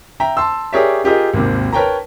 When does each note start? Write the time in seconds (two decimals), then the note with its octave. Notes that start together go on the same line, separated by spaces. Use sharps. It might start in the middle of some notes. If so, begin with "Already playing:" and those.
0.20 E5 G5 A#5
0.37 A5 C6 E6
0.73 G4 G#4 A#4 C#5 D5 E5
1.04 F4 G4 G#4 A#4 D#5
1.33 G#1 D#2 C3
1.73 A#4 B4 C#5 G5 A5 A#5